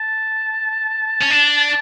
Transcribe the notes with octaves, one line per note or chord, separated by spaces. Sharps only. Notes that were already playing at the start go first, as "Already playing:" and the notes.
Already playing: A5
C#4
D4